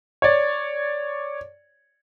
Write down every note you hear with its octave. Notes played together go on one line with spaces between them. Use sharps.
C#5 D5